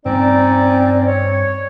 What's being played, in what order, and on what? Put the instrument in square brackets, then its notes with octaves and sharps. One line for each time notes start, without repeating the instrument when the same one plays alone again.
[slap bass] G2 A#3 [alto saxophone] C4 [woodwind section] C#4 D#4 D5
[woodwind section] C#5